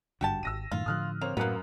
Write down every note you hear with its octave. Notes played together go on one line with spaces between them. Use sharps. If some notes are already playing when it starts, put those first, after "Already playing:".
G#1 G2 D3 F#4 G4 A5
D#1 G#1 E6 A#6 D#7
F#2 A2 D#3 F4
A2 D3 F3 D#6 F6 F#6
A#3 C4 C#5 F7
F#2 A2 A#3 B3 A#4 F#6